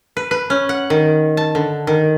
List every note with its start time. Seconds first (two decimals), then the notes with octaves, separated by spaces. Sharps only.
0.17 B4
0.31 B4
0.50 C#4
0.69 F#5
0.90 D#3
1.37 A5
1.55 D3
1.87 D#3